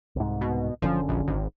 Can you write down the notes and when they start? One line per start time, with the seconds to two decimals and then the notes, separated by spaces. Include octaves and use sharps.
0.16 C2 G#2
0.41 B2
0.82 F#1 D3 F3 C#4
1.08 A#1
1.27 G#1